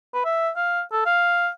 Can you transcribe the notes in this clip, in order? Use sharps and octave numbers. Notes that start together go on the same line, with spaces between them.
B4
E5
F5
A4
F5